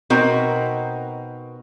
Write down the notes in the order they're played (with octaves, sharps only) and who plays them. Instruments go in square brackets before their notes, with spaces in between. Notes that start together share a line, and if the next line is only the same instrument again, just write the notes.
[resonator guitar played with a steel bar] B2 C4 D#4 F#4 A#4 A#5